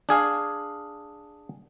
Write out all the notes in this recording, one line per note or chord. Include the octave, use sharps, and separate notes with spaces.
D4 G#4 F5